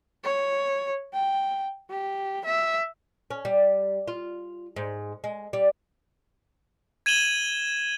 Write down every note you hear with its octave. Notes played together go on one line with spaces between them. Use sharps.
C#5
G5
G4
E5
C#4
G3
F4
G#2
G#3
G3
G#6 D#7 E7 F#7 G7